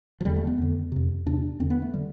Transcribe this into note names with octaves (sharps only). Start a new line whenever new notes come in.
F3
E2 D3 G3
A3
B3
F2 D3
F2 C3
E2 C3 D4
E2 D3 C4
B3
A3
D3 G3